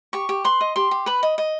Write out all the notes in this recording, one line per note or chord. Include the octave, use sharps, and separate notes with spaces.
G4 C#6
G4
B4 C6
D#5
G4 C6
G4
B4 B5
D#5
D#5